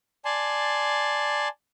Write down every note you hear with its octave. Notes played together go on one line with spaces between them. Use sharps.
D5 G#5 A5 C6